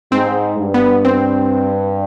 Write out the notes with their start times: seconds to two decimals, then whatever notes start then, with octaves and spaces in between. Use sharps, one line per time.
0.12 G#2 C4
0.58 G2
0.74 B3
1.05 C4